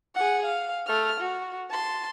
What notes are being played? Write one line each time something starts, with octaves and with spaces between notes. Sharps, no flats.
G#4 F#5
F5
A3 F6
F#4
A5 C6